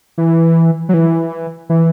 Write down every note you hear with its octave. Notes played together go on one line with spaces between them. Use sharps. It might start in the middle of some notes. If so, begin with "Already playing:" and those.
E3
F#3
E3
E3